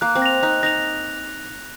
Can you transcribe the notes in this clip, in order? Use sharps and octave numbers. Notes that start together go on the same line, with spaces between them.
A#3 F#6
C4
A#6 F7
D#4 F#6
D#4 A#6 F7